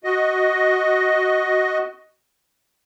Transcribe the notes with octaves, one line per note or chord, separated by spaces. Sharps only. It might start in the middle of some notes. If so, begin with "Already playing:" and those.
F#4 D#5